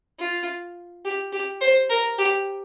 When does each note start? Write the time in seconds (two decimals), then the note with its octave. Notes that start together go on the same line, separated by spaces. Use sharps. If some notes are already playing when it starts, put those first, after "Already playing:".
0.20 F4
1.05 G4
1.33 G4
1.61 C5
1.90 A#4
2.19 G4